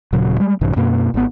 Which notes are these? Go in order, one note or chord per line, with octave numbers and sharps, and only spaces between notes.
D#1 A#2 C#3 F#3
G3 G#3
A#1 G2 C3 E3
F#2 B2 A#3
G#1 B3